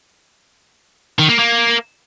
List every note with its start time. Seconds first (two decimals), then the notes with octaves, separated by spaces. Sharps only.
1.19 D#3
1.29 A#3
1.39 A#3